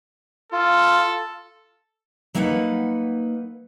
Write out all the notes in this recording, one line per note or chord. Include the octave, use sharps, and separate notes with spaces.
F4 A4
F#3 A#3 D#4 B4 F#5